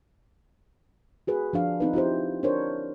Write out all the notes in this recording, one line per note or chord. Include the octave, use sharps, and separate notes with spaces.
F#4 G#4 B4
F3 D4 F5
C4 D#4 B4
E4 F4 G4 C5
D4 A#4 C5 C#5